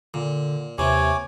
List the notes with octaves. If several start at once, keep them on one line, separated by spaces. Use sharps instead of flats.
A#2 D3
D#2 C3 E3 C#5 G#5 D6